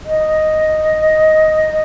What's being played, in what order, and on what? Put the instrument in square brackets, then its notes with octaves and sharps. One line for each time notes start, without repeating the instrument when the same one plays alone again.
[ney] D#5